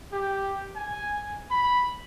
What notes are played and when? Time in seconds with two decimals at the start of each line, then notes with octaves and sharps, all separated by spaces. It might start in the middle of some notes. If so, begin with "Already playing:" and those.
0.12 G4
0.76 G#5
1.51 B5